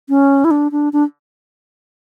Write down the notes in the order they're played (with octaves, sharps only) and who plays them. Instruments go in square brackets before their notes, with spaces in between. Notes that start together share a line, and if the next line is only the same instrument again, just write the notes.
[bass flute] C#4
E4
D4
D4
D4